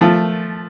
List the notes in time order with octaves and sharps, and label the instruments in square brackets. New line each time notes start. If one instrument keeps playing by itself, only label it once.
[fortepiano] F3 A3